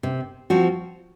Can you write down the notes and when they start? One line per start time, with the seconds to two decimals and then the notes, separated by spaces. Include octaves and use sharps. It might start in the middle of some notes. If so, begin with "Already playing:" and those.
0.03 C3
0.50 F3 C4 F#4